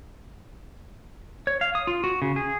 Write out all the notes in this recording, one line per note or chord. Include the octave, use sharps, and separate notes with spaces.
C#5
F5
D#6
F4
F#4
C#3
G#4